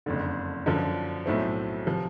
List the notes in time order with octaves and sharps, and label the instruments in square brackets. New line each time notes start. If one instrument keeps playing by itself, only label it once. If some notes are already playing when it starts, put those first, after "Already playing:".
[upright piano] F#1 F2 D3
F#2 D3 F3
B1 A2 F#3 A3 C4
C3 F3